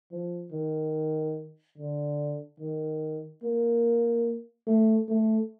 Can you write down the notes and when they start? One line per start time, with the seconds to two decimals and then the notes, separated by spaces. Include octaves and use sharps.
0.12 F3
0.52 D#3
1.78 D3
2.60 D#3
3.44 A#3
4.67 A3
5.09 A3